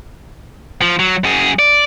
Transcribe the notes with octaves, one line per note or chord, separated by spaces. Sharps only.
F3
F#3
F#2 G#4
D5